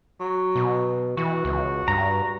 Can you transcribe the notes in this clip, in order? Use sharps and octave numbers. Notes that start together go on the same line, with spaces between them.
F#3
B2
E3 F#4
C#2
G2 A#5